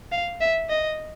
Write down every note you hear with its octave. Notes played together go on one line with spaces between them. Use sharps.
F5
E5
D#5